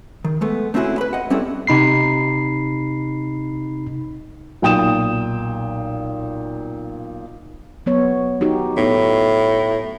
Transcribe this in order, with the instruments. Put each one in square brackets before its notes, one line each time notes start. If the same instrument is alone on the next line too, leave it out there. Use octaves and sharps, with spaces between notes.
[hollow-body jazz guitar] D#3
G#3 A3 B3
A3 C4 C#4 E4 F#4 G#4
B4 B5
D#5 F#5
G3 C4 C#4 E4 G#4 A4
[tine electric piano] C3 D#4 B5 C7
[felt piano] B1 A#2 G5 D#6 E7
[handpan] F#3 B3 C#5
D#4 F#4 G4
[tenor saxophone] A2 [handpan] B3 D#4